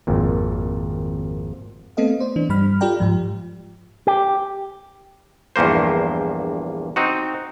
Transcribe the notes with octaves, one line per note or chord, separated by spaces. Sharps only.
G#1 F2 A#2
A3 B3 C4 A4 D#5 F5
C5 D5
E3 D4
G2 G3 B5 F6
F4 G4 A4 D5 G5 A#5
G#2 F3
G4
A#1 E2 G2 A#3 C5
C4 D#4 F#4